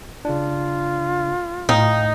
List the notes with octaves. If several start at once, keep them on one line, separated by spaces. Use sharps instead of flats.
C#3 D4 F4
A2 D#4 F5 G5 A#5